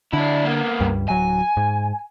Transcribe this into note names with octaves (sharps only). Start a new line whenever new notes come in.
D3 D4 E4
A#3 B3
C#2 G2 G3
D1 F#3 G#5
G#2